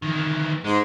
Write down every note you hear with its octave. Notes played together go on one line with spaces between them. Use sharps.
D#3 E3
G#2 G#3